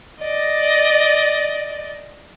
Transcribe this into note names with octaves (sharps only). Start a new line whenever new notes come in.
D5 D#5